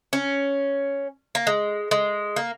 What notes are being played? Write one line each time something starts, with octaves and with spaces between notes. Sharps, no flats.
C#4
A#3
G#3
G#3
A#3